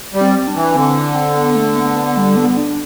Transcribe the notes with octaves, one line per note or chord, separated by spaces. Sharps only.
G3
C4
D4
E3
D3 C4
C4
B3
A3
B3
B3
G3
B3
D4